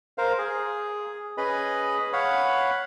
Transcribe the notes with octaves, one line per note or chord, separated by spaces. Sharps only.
A#4 C5 F5
G#4
C#4 G#4 B4 D#5 B5
C#5 F5 F#5 B5